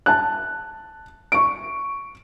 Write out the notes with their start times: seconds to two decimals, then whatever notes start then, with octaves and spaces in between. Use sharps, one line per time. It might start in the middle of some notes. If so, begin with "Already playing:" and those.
0.06 A5 F#6
1.32 C#6 D7